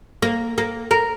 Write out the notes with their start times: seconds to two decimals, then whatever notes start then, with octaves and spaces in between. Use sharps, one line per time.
0.22 A#3
0.58 A#3
0.91 A#4